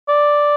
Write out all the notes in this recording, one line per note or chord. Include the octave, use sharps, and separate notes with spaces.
D5